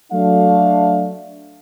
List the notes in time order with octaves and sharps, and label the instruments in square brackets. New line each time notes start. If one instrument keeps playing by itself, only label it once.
[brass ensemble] F#3 A3 D4 F5